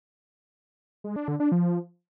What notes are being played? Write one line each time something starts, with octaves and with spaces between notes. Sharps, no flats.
G#3
D4
D3
D4
F3